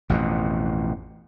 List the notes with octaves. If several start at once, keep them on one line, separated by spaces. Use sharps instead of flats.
A1 F2 B2